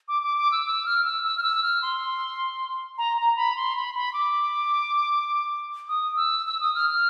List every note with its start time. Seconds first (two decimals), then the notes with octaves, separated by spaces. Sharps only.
0.08 D6
0.23 D6
0.38 D6
0.52 E6
0.66 E6
0.86 F6
1.05 E6
1.24 E6
1.37 F6
1.43 E6
1.63 F6
1.82 C6
2.98 A#5
3.17 A#5
3.36 B5
3.56 C6
3.76 B5
3.95 B5
4.13 D6
5.88 D#6
6.16 E6
6.47 E6
6.60 D#6
6.75 F6
6.90 F6